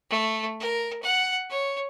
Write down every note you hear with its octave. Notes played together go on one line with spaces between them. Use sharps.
A3
A#4
F#5
C#5